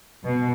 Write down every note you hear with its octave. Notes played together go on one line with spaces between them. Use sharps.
B2